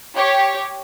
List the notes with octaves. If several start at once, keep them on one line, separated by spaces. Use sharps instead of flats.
G4 C#5